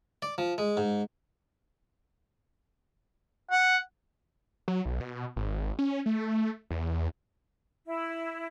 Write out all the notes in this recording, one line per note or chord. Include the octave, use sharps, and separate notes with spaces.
D5
F3
G#3
G#2
F#5
F#3
B1
B2
G#1
C#4
A3
E2
E4